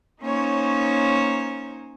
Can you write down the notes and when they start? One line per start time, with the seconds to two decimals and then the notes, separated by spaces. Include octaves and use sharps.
0.21 A#3 C#4 D#4 C5 C#5